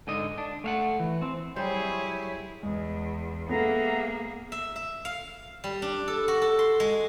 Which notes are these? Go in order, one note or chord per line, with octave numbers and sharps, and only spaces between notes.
G#2 D3 D#5
D4
A3 F5 F#5
E3
C4
F#3 G3 E4 G#4 C5 C#5
E2 G#3
A#3 B3 G#4 A4 E5 F#5 A#5
E5
E5
F5
G3
D4
A4
F#4
A4
C6
G#3